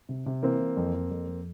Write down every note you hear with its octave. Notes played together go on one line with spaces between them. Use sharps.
C3
C3
E3 A#3 C4
E3
F2
F2
F2
F2